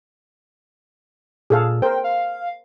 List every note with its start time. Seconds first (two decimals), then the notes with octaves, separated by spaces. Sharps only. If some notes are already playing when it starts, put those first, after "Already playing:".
1.50 A#2 G#4 A4 F5
1.82 A#4 C5 G5
2.04 F5